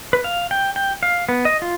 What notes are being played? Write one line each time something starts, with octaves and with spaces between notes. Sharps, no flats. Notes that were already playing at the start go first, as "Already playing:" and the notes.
B4
F5
G5
G5
F5
B3
D#5
F4